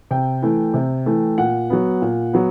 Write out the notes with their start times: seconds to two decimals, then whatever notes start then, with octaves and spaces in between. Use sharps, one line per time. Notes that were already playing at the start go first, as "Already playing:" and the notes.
0.11 C3 G5
0.42 E3 A3
0.74 C3
1.06 E3 A3
1.38 A#2 F#5
1.70 F#3 B3
2.02 A#2
2.33 F#3 B3